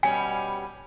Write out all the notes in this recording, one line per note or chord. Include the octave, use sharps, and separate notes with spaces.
B2 G3 C#4 G#5